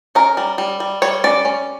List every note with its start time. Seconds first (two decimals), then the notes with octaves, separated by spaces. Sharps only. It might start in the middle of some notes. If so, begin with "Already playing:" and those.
0.15 C#4 A#4
0.37 G3
0.58 G3
0.80 G3
1.02 G3 C#5
1.24 C#4 D5
1.45 C#4